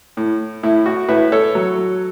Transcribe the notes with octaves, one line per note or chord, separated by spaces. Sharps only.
A2
A2 E4
F#4
A2 B4 E5
A4 C#5
F#3